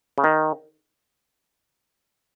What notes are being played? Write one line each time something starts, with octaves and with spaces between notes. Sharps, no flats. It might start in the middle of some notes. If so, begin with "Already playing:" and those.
C#3
D#3